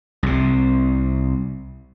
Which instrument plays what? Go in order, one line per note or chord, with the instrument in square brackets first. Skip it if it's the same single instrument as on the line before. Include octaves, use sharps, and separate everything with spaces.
[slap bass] C2 C3